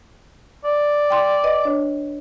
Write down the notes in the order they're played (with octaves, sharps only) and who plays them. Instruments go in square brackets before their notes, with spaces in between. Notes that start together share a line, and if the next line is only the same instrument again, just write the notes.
[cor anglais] D5
[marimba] G5 C6 D6
B4 D#5
D4 C#5